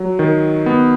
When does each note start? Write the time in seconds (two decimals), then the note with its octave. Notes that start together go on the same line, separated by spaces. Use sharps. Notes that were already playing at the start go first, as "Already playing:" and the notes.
Already playing: F#3
0.19 D#3
0.66 B3